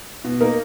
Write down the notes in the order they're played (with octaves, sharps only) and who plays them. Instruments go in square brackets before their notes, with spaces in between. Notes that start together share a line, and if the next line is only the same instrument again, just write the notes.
[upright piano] B2
A#3 D#4 A#4